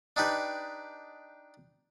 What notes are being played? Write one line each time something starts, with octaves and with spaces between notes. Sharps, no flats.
D4 D#4 G4 B4